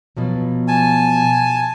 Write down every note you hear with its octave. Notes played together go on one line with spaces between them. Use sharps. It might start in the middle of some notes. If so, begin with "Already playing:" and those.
B2 F3 F#3
G#5 A5